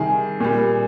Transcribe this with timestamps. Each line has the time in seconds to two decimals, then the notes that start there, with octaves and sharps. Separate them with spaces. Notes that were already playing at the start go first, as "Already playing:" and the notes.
Already playing: C3 D#3 G3 G#4
0.40 A#2 G3